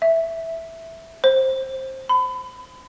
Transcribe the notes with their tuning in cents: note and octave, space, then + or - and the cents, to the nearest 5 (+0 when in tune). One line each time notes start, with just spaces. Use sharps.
E5 -5
C5 +15
B5 +35